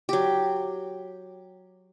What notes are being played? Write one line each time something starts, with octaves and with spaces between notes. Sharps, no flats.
F#3 G4